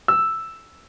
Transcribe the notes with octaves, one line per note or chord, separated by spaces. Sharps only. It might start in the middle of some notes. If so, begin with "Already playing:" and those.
E6